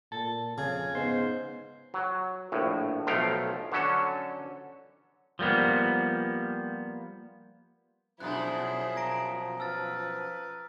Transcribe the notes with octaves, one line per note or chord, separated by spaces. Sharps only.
A#2 A5
F2 C#3 G#5
G#2 B3 C5
F#3
A#1 A2
B1 F3 A3 F5 G5
D3 F#3 C#4 A4
F3 G3 A#3 B3
F#2 B2 F3 D4 E4 G#4 D#6 F#6
A#5 A#6 D7
B4 E6 F6 A6